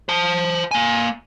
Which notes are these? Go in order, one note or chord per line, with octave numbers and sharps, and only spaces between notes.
C5 A5
A#3 G#5